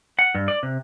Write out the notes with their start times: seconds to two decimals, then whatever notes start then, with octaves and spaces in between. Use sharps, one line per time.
0.19 F#5
0.35 G2
0.48 D5
0.63 C3